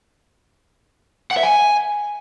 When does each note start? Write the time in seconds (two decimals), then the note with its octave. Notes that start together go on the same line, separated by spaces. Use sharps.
1.31 F#5
1.37 E5
1.43 G#5